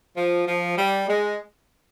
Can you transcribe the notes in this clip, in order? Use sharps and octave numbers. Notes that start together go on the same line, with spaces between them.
F3
F3
G3
G#3